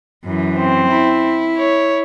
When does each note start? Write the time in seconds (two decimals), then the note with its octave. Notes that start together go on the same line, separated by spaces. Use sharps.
0.25 F#2 E3
0.58 C4
0.87 E4
1.58 C#5